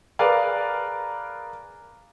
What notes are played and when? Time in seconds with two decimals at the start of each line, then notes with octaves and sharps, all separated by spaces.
0.19 G#4 A#4 B4 D5 F5 G#5